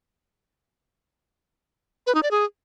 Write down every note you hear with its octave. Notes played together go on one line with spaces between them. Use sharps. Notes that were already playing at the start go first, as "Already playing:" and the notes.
B4
D#4
D5
G#4